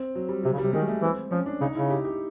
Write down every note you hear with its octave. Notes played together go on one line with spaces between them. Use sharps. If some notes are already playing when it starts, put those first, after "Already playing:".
Already playing: C4
F#3
G3
C3 F#3
C#3
G3
C3
D#3 G#3
A3
E3 C4
F3 C#4
D4
C#3 D#4
C#3 E4
G4
G4